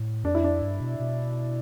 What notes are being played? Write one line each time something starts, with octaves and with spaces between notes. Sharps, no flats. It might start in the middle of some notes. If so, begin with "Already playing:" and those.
Already playing: A2
F2 D4
E4
D4
G2
B2
B2